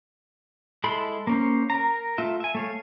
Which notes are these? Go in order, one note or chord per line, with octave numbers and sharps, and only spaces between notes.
G#3 E4 A4 B5 C6
A#3 C#4 C5
A#4 A#5
A3 F4 E5
E5 G#5
A3 C#5 F5